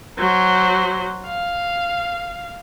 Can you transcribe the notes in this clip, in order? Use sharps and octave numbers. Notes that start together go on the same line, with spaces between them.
F#3 C5
F5